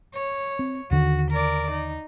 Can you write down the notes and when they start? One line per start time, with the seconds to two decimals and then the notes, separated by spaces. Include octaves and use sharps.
0.14 C#5
0.59 C4
0.91 D#2 D3 D#3 F#4
1.31 A#4 D5
1.71 D#4